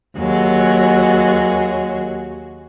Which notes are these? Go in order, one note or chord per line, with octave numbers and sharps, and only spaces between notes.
D#2 F#3 G#3 F#4